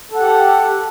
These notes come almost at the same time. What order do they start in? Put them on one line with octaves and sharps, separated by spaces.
A4 F#5 G4